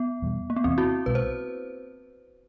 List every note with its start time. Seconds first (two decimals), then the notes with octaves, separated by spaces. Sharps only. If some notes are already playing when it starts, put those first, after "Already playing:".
Already playing: B3
0.22 E2 B2 G3
0.50 A#3
0.56 B3
0.64 E2 C3 E3 C4
0.78 E4 F#4
1.06 B1 B2 G#3 B3 B4
1.15 C5